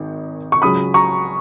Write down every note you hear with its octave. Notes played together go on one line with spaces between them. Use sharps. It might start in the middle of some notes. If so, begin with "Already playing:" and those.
Already playing: G#1 D#3
C#6
C#2 C#3 F#3 C#4 B5 D#6
A#5 C#6